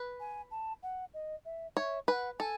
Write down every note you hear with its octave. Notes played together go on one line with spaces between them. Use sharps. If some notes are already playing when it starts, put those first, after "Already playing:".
Already playing: B4
G#5
A5
F#5
D#5
E5
C#5 E5
B4 F#5 G#5
A4 G#5